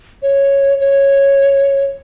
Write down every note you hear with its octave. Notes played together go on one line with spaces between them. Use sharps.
C#5
C#5